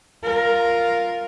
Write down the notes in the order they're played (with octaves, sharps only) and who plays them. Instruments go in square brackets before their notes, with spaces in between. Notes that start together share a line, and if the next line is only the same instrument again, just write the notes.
[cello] F4 A#4